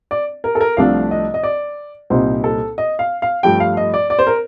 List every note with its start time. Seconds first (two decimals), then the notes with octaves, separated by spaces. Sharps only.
0.11 D5
0.44 A#4
0.55 A4
0.61 A#4
0.77 C2 C3 F3 A3 D4 F5
1.11 D#5
1.34 D#5
1.43 D5
2.10 C2 A#2 G3 C4 D#4 C5
2.44 A4
2.78 D#5
2.99 F5
3.22 F5
3.43 G2 F3 A3 G5
3.60 F5
3.77 D#5
3.94 D5
4.10 D5
4.19 C5
4.27 A#4